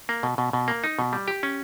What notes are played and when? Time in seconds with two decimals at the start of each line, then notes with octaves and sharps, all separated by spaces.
0.09 A#3
0.23 B2
0.38 B2
0.53 B2
0.68 A#3
0.84 D#4
0.99 B2
1.13 G3
1.28 G4
1.43 C#4